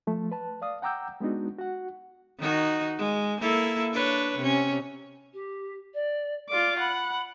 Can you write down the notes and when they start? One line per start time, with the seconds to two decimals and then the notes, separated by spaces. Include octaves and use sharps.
0.07 F3 A3
0.32 B4 A5
0.62 D5 F5 D#6
0.82 F#5 G5 A#5 D6 E6 G6
1.20 G#3 B3 D4 D#4 F#4
1.58 F#4 F#5
2.39 D#3 D#4 F#4
2.98 G#3
3.41 A#3 E4 A4
3.92 D4 B4 C#5
4.38 C3 C#4
5.33 G4
5.94 D5
6.49 F4 D5 D6
6.79 F#5 B5